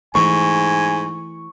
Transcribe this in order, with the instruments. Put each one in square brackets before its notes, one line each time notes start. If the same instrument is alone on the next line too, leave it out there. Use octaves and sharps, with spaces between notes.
[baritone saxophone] G#2 [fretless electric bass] E3 A3 [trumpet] G#5 [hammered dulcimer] C#6